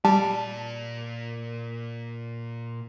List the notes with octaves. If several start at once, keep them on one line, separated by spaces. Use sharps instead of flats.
A#2 G3 D5 A5